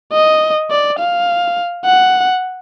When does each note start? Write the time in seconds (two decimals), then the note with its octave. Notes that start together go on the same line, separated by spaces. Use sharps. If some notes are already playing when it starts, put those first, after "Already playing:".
0.13 D#5
0.71 D5
0.99 F5
1.85 F#5